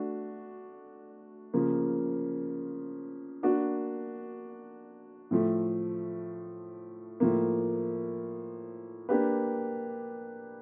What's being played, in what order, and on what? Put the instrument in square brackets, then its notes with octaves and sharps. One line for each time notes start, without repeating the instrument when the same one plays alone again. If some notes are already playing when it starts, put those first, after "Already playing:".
Already playing: [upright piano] A3 D4 F#4
C#3 F3 A#3
A#3 D4 F#4
A2 F3 A3
A2 F3 A#3
A#3 D4 G4 B4